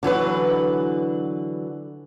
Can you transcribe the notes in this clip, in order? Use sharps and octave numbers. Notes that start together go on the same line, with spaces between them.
D3 E3 F#3 B4